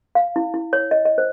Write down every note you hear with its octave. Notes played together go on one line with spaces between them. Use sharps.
F5
E4
E4
C#5
D#5
D#5
C5